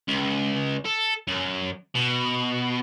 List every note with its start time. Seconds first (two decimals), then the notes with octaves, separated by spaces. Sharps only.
0.08 C#2
0.85 A4
1.28 F#2
1.95 B2